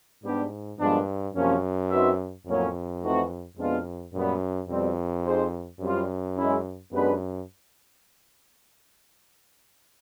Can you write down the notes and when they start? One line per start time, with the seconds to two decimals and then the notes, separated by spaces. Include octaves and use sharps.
0.23 G#2 G3 B3 D4 G4
0.78 G2 A#2 F3 G#3 B3 D4
1.34 F#2 C3 F3 A#3 C#4
1.90 C4 D#4 F#4 B4 E5
2.46 F2 A2 F#3 A#3 C#4
3.02 E3 A3 C4 D#4 F#4
3.57 F2 B2 G#3 B3 D4 F4
4.13 F#2 A#2 G3 B3
4.69 F2 B2 G3 C4
5.24 C4 D#4 G#4 C5
5.80 F#2 G3 C4 F4
6.37 G#3 C#4 E4
6.92 F#2 G#3 B3 D4 G4 B4